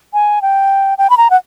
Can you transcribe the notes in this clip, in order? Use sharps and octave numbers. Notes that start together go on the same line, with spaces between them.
G#5
G5
G5
B5
A#5
F#5